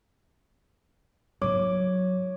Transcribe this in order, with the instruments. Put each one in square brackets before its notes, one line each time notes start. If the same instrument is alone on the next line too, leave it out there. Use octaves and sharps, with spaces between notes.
[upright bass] G#2 F#3 [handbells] C#5 D6